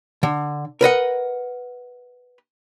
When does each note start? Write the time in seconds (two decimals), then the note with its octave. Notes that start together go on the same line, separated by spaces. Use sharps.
0.23 D3
0.81 A#4 B4 D#5 F#5